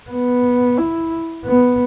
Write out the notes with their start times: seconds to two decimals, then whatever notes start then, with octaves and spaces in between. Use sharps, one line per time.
0.10 B3
0.78 E4
1.46 B3